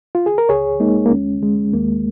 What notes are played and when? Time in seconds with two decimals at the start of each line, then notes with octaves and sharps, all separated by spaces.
0.15 F4
0.26 G#4
0.38 A#4
0.49 C#2 G#4 C#5
0.80 G#3 A#3 D#4
1.06 A#3
1.11 D#2 C#4
1.42 G#3
1.74 D#2 A#3